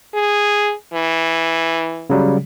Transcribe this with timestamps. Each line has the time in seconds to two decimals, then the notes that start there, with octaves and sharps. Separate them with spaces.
0.14 G#4
0.93 E3
2.10 C#3 F#3 G3